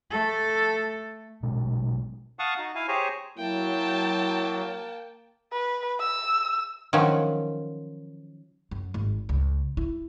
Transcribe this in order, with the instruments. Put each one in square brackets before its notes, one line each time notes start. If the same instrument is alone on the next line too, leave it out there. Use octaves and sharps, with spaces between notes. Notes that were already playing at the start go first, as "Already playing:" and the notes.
[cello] A3 A4
[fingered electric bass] A#1 B2 G#3
[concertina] F5 F#5 A5 C#6 D#6
D#4 F#4
E4 F5 G#5
G4 G#4 C5 C#5 G#5 A#5
[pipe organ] F#3 [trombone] A#3 [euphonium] E4 [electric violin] G5 A5
[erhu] B4
E6
[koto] D#3 F3 F#3 C#4
[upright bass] F#2
G#1
C#2
E4